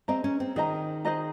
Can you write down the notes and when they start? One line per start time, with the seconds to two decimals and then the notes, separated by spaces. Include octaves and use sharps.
0.08 C4 G#4 C5 D#5 A#5
0.24 C#4
0.40 C4
0.56 D#3 G#4 C5 D#5 A#5
1.05 G#4 C5 D#5 A#5